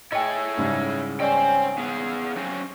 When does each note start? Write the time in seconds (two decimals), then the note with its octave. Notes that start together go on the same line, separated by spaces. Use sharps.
0.12 E4 G#4 C#5 D#5 G5
0.58 G#2 C#3 G3
1.20 C#4 C5 D5 D#5 G5
1.78 B3 G#4 F5
2.36 F#3 C4 C#4